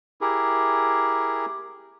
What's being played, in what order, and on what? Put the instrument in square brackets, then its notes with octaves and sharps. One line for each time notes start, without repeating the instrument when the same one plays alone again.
[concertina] E4 G4 G#4 A#4